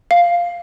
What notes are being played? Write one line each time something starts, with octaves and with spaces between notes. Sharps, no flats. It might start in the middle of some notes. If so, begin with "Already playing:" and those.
F5